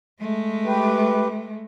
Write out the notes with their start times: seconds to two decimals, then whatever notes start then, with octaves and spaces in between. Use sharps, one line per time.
0.21 G#3 A3
0.66 G4 B4